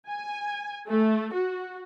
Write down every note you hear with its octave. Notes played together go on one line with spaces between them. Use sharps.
G#5
A3
F#4